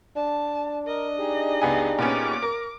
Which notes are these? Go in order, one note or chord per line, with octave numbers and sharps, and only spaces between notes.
D4 A5
A#4 D#5
D#4 G4 G#4
C#2 B3 G#5
A#2 B3 C#4 D6
A#4